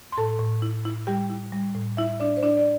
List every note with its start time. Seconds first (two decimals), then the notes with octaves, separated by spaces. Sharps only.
0.12 C6
0.18 A2 A4 A5
0.39 A2
0.62 E4
0.85 E4
1.07 G3 G4 G5
1.30 E4
1.52 G3
1.75 A2
1.97 E4 E5
2.20 D4 E4 D5
2.37 C5
2.43 D4 E4 D5
2.57 D5